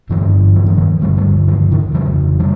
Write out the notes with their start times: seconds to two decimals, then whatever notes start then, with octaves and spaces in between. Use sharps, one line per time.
0.10 G2 D3 E3 F#3
0.56 F3
0.67 E3
0.77 D#3 F3
1.02 G2 D3 F3 G3
1.17 F3 G3
1.48 D#3 F3
1.71 D3 E3
1.93 F2 C#3 E3 F#3
2.40 F3 G3